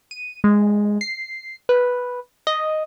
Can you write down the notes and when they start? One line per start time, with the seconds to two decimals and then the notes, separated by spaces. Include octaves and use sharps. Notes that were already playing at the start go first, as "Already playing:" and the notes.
0.11 D#7
0.44 G#3
1.01 C7
1.69 B4
2.47 D#5